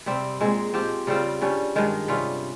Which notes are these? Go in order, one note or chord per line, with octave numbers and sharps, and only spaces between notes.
C3 G3 C4
A#2 G#3 C4
F3 C4 G4
C#3 G3 C4 F4
G2 G3 C#4
G2 D#3 G#3
C3 G3 C#4 F4